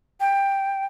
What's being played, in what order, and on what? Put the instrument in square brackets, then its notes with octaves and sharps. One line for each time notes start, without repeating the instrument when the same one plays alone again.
[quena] G5